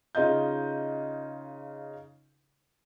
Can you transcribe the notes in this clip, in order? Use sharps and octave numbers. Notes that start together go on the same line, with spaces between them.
C#3 D#4 F4 D#5 G6